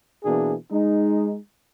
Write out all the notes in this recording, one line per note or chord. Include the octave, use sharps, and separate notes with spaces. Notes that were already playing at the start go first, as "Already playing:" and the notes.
B2 E3 A#3 D4 G#4
G#3 D#4